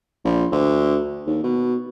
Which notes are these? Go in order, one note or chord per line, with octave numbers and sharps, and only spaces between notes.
A#1
D2
D#2
B2